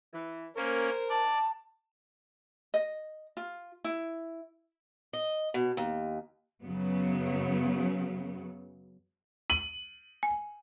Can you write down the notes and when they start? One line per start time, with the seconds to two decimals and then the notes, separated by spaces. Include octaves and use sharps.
0.13 E3
0.56 A#3 C#4 A#4 C5
1.10 D5 A5
2.74 D#5
3.37 F4
3.84 E4
5.13 D#5
5.54 B2
5.77 D#2
6.63 F#2 C#3 F#3 B3
9.50 D#7 F#7
10.23 G#5